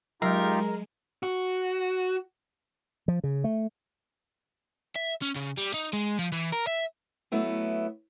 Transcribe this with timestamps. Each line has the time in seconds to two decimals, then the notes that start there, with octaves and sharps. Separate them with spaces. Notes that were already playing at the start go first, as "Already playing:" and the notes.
0.22 F#3 G#3 D#4 F4 G4 A#4
1.23 F#4
3.08 F3
3.24 C#3
3.44 A3
4.96 E5
5.22 C#4
5.35 C#3
5.57 G3
5.74 D#4
5.93 G#3
6.19 F3
6.32 E3
6.52 A#4
6.67 E5
7.32 F#3 A3 B3 E4